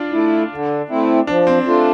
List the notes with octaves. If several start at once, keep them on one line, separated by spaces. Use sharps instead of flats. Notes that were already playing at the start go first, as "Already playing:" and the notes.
Already playing: D4 F4 D5
A3 E4
D3
A3 C4 E4
F3 D4
C4
A3 D4 F4